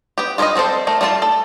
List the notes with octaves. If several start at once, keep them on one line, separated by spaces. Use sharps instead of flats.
B3 G4
F4 G#4 A#4 B4 D#5
G3 C4 A4 C5
A3 A#4
G3 A3 F4 A5
A4